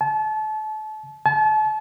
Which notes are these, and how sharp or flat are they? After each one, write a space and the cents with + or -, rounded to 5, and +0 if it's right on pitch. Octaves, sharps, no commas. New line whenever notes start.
A5 -30
A5 -35